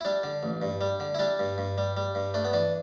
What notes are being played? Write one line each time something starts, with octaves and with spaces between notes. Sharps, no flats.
E4
G3 D4
D3
A1
G2
G3
D3
E4
G3 D4
G2
G2
G3
G3
G2
A3 D4
B3
E3 D4